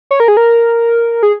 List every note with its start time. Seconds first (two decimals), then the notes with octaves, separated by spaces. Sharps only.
0.11 C#5
0.20 A#4
0.28 G#4
0.37 A#4
1.23 G#4